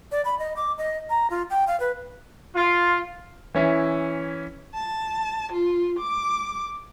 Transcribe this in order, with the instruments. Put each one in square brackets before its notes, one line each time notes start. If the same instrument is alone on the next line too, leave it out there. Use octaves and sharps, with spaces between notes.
[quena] D5
B5
D#5
D6
D#5
A#5
F4
G5
F5
B4
[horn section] F4
[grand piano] E3 C#4 E4
[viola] A5
F4
D6